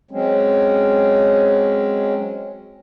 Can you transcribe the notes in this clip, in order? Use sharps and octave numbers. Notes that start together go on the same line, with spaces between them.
F#3 G#3 C4 C#4